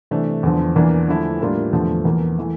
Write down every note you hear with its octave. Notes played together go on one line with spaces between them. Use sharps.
C3 E3 A3 D4
E2 D3 F3
E2 E3 A#3 D4
D3 F3 A3 E4
A2 G3 A#3 D4 F4
E2 D3 F3 A3
E2 E3 A#3
E3 A3